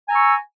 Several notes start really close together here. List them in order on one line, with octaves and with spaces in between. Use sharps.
G#5 A#5 E6 C#6